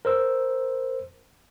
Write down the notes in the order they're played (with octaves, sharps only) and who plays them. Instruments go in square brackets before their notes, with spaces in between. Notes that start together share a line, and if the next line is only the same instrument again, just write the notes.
[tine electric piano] A#4 C5 E6